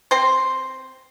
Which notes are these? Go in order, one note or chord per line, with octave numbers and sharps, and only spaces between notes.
C4 C5